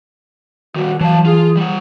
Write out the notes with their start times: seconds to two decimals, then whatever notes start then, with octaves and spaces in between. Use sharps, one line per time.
0.76 D#3 G3 F#4
1.01 E3 F#3 F5 A5
1.26 F4 G#4
1.57 G3 F#5